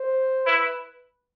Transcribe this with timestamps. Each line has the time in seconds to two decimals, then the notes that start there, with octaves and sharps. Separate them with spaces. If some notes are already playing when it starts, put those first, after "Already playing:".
Already playing: C5
0.46 E4 B4